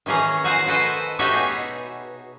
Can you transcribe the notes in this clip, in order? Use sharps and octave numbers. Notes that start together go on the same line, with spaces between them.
D#3 E3 C#4 G#4 A#5
F#4 G#4 C5 A#5
F#4 A4 B4 C5 D#5
D#4 F#4 G4 A4 C#5 E5
B2 G#4